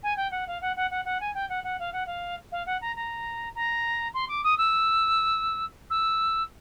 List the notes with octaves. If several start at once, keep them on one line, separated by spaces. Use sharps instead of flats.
G#5
G5
F#5
F5
F#5
F#5
F#5
F#5
G#5
G5
F#5
F#5
F5
F#5
F5
F5
F#5
A#5
A#5
A#5
C6
D6
D#6
E6
E6